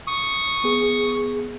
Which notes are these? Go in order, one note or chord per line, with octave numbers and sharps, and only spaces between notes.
C#6 D#6
B3 G#4